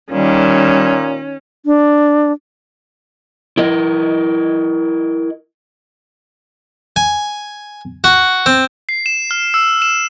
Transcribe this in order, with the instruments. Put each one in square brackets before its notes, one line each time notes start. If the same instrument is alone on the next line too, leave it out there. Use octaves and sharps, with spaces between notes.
[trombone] A#2 [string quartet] D#3 [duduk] G3 [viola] C#4
[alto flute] D4
[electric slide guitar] E4 A#4 D#5
[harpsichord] G#5
F#4
C4
[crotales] C7
E7
F6
E6
E7